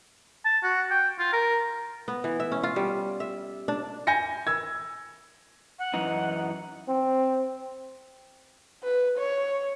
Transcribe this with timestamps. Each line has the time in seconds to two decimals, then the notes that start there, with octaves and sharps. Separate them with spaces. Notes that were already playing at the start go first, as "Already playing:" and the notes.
0.45 A5
0.64 F#4
0.91 G5
1.19 F4
1.33 A#4
2.08 B3
2.24 E3
2.40 E5
2.52 C#4
2.63 F4
2.76 G3
3.20 E5
3.68 D4
4.07 G#5 G6 A#6 C#7
4.47 E6 G#6
5.79 F#5
5.94 F#2 E3 D#4
6.89 C4
8.83 B4
9.18 C#5